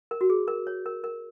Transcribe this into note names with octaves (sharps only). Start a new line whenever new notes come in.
A#4
F#4
G#4
A#4
C#5
A#4
A#4